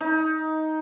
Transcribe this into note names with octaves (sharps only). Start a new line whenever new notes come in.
D#4